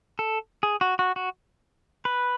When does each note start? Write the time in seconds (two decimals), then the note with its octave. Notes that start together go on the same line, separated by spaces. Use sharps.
0.19 A4
0.63 G#4
0.81 F#4
0.99 F#4
1.16 F#4
2.05 B4